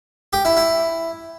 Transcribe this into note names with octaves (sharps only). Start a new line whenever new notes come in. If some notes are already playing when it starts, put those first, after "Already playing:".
G4
E4
E4